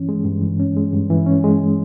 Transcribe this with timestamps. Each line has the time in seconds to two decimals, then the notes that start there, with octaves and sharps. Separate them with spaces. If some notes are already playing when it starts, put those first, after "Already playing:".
Already playing: G2 E3 C#4
0.09 G#3
0.25 G2
0.42 E3
0.60 C#4
0.77 G#3
0.93 G2
1.10 E3
1.26 C#4
1.44 G#3